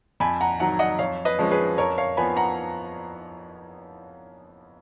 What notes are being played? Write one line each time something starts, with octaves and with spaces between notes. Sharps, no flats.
F2 G#5 B5
F#5 A#5
D#3 F#3 F#5 A#5
D#5 F#5
F2 C#5 F5
B4 D#5
F3 G#3 C#4
G#4 B4
F2 A#4 C#5
C#5 F5
F3 B3 G#5 B5
F#5 A#5